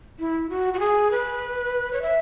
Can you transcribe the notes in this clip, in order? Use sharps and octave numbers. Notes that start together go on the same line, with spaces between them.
E4
F#4
F#4
G#4
B4
C#5
E5